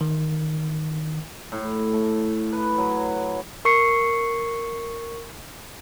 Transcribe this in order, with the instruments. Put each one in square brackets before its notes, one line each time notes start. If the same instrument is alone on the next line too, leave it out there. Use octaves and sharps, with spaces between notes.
[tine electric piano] D#3
[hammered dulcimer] A2
A3
B4
F#3
[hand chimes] A#4 C#6 C7 C#7